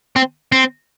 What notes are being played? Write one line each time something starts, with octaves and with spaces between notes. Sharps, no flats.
C4
C4